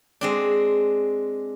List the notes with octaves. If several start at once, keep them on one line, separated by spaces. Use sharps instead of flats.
G#3 C4 D4